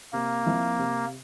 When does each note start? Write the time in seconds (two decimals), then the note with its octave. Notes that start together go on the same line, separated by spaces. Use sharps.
0.13 C3 A#3
0.46 F3 C4 E4
0.79 C3